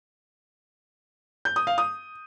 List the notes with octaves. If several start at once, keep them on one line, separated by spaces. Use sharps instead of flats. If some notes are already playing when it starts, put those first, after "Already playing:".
G6
D#6
F5
D#6